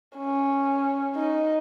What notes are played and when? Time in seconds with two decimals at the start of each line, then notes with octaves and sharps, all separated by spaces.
0.17 C#4
1.16 D#4